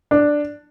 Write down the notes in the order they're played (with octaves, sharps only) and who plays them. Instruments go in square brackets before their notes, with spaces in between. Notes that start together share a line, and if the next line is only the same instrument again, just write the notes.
[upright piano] D4